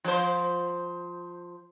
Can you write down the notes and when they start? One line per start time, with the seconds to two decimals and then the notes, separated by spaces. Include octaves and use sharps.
0.04 F3 C5